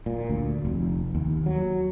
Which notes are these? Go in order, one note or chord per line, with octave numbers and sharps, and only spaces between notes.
A#2
D2
F1
D#2
F#3